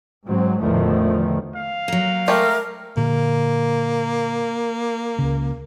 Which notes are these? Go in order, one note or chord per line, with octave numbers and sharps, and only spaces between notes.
G#2 F#3 C4
A1 E2 D3 D#3 F3 A3
F5
F#3 A#3
G#3 A3 G4 A#4
A#2 D3 A#3
C#2 C#3